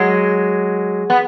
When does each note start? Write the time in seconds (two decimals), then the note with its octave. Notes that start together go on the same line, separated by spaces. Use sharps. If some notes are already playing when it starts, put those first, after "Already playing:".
Already playing: F#3 G#3
1.10 B3